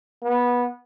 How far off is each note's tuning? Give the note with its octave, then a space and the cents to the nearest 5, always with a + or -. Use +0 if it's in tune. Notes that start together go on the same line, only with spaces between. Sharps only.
B3 -15